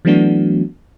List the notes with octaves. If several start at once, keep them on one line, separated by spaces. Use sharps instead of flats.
E3 F#3 A3 B3 D4 F#4